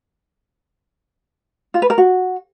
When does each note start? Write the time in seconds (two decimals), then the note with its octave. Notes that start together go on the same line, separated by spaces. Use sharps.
1.74 F4
1.82 B4
1.90 A#4
1.98 F#4